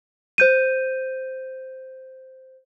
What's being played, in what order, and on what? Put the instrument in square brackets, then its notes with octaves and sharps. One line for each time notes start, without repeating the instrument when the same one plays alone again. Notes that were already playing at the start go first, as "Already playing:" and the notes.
[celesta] C5 G6 D#7